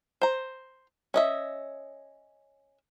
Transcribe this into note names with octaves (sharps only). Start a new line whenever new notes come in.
C5 A#5
C#4 D#5 E5